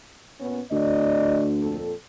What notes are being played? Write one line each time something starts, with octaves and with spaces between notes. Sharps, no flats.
A#2 B3 C#4
D2 D5 D#5
F2 A#2 A4